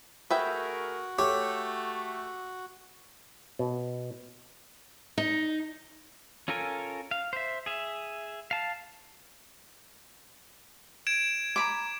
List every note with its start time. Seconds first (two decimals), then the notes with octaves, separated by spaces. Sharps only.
0.30 A3 F#4 G#4 A#4 B4 E5 G5
1.19 A3 G4 C#5
3.59 B2
5.18 D#4
6.48 C#4 F4 A4 A#4 G#5
7.11 F5
7.33 C5 E5
7.66 G#4 E5
8.51 F5 A5
11.07 G#6 D7 E7
11.56 A#5 B5 D6